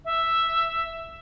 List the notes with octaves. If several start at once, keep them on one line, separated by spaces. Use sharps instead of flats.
E5